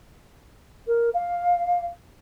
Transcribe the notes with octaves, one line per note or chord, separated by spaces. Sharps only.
A#4
F5